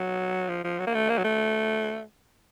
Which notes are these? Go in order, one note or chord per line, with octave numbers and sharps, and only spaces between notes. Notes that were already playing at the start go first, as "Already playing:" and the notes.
Already playing: F#3
F3
F3
F#3
A#3
A3
A#3
F#3
A3